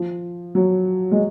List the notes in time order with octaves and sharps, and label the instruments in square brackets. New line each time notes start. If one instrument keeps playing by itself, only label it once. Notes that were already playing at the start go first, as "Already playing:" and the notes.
Already playing: [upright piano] F3
F#3
G#3